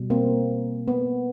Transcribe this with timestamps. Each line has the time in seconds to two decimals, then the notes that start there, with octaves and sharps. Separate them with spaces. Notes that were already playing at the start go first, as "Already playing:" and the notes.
Already playing: B2 G3
0.10 A#3 C4
0.88 B3